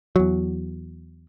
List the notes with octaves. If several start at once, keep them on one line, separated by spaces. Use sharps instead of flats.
E2 F#3